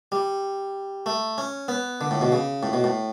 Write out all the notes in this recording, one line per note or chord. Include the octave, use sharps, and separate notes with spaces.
G3
A3
C#4
B3
D3
A2
B2
C#3
A2
B2
A2